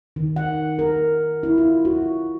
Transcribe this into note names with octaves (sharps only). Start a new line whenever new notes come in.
D#3
F#5
A#4
E4
F4
F#4